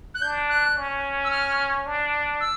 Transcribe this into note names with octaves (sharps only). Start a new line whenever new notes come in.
F#6
D4 G6
F#6
C#4
E6
F6
D4
E6